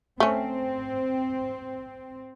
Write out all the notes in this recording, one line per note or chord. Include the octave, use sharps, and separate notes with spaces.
A3 C4 C#4